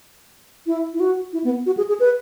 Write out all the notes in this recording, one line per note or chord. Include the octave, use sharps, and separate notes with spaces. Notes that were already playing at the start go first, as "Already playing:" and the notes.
E4
E4
F#4
E4
B3
F#4
G#4
G#4
B4